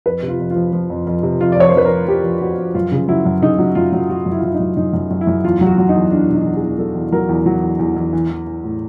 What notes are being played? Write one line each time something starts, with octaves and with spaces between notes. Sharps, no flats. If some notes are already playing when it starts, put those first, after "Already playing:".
F2 B4
C3
F4
F2
F4
F3
F3
F2
F2
C3
F2 F4
D5
F3 C#5
C5
F2 B4
A#4
F2
F3 G4
F3
F2 F#4
F2
F#2 F4
C#3
F#3 E4
F#2
C#3 D#4
F#3
F#2 F4
F#3
F#3 F#4
F#2
E4
F4
F#2 E4
D#4
F#2
F#2 D#4
F#2
F#2
E4
F#2
E2 F4
F#3
F#4
F#3
D#4
E2
E2 D4
B2
D#4
E2
G#4
E2
F#3 A4
E2
F#3 A#4
E2
F#3
E2
E2
E2
E3
E3
E3
A2